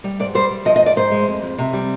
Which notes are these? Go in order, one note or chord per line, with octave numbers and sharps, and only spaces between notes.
G3
G#2 D5
G3 C5
G3
F3 D#5
D#5
G#2
D5
G#2 C5
G#3
F2
F2
C3
G3